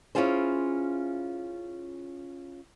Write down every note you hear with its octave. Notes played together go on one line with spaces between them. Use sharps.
C#4 D4 E4 F4 G#4 C5